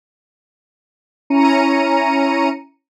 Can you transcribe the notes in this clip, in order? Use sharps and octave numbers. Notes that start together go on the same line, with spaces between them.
C#4 E4 A#5 C#7 D#7